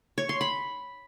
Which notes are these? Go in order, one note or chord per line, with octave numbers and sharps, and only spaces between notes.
C#5
C6
B5